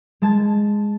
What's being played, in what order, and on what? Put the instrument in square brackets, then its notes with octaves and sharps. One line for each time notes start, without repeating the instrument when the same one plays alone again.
[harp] G#3 A5 G#6 A6